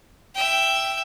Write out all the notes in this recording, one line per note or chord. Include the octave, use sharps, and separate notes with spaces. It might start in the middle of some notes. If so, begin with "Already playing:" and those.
E5 G5